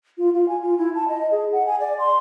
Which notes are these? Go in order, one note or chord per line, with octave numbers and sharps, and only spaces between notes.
F4
F4
G#5
F4
E4
A5
D#5
G#4
F#5
G#5
D5
C6